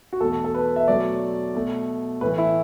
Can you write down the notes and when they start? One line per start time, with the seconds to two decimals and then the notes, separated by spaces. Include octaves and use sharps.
0.13 F#4
0.20 E2 B2 A3 A4
0.44 A4
0.55 B4
0.76 E5
0.88 B2 F#3 A3 D5
1.55 B2 A3
2.21 A2 E3 A3 B4
2.38 E4